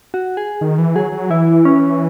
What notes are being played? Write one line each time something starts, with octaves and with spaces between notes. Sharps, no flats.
F#4
G#4
D#3
E3
F#3 G#4
F#3
E3 E4
C#4